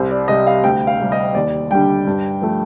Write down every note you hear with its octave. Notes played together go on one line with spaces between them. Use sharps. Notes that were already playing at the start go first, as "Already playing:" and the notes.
Already playing: C2 C5
D5
C3 G3 D#5
F5
D2 G5
F5
C3 G3
D#5
D#2 D5
D3 G3 G5
G2
F3 A3